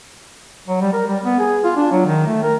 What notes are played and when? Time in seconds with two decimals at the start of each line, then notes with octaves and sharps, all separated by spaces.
0.67 F#3
0.81 G3
0.93 A#4
1.07 G3
1.24 B3
1.39 G#4
1.64 F4
1.77 D4
1.91 F#3
2.05 D#3
2.26 A3
2.43 A#4